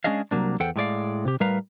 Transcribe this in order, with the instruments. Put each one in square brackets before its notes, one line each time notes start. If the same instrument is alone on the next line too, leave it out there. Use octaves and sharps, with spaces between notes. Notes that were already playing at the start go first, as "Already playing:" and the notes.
[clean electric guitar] G#3 C#4 D4 G#4 D#5 F5
C2 F#3 A#3 D4
E2 A4 C5 F#5 G5
A2 G#3 D5 F5
C3 G4
A2 G3 A#4 B4 F5 A#5